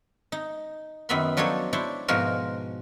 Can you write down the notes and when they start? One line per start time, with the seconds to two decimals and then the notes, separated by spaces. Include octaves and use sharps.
0.32 D#4
1.09 F#2 D#3 B3 E5 B5 C6
1.37 F3 F#3 D4 D#4 A4 C#5
1.73 D4 E4 C5 C#5
2.08 G#2 B2 F3 F#4 A#4